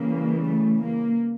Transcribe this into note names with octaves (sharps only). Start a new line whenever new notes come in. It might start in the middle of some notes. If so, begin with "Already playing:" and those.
Already playing: C#3 E3 G3 A#3
A3
A#3